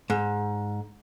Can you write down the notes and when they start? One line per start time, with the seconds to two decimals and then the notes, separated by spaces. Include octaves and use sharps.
0.10 G#2